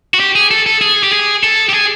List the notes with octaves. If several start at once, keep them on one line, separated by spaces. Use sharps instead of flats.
F#4
G4
G#4
A4
A4
G#4
G4
G#4
A4
G4
G#4